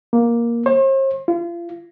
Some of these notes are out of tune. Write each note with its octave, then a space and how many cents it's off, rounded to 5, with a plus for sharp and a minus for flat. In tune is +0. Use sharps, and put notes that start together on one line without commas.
A#3 +10
C5 +45
F4 -35